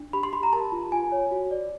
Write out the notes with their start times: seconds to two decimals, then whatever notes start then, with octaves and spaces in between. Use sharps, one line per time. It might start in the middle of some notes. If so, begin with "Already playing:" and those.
Already playing: D4
0.13 G4 B5
0.23 C6
0.33 G4 B5
0.43 A#5
0.53 A#4 A5
0.72 F4
0.92 F4 G#5
1.12 C#5
1.31 F#4
1.51 D5